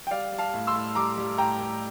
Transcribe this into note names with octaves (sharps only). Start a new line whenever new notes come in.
G5
G3 D5 F5
G3
F5 A5
A2
C6 E6
A2
G3 A#5 D6
G3
A2 G5 A#5
A2